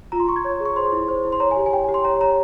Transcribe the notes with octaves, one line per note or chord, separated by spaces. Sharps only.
F4 A#5
C6
F4 C#6
G#6
C#5
G#4
C#6
C5 C6
E4
C5
E4
C6
C#5 A#5
G#5
G4
G#5
G4 G5
G#5
G4
C6
C#5 A#5
C#5 A#5